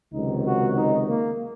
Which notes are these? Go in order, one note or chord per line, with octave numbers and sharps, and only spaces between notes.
C#2 C3 D#3 F#3 D#4
F#4
D#4
A#3